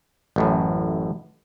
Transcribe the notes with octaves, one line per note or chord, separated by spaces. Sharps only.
A1 F#2 A2